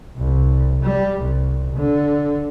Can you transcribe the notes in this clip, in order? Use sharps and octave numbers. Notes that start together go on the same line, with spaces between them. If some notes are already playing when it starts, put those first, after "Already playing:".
C2
G3
C2
D3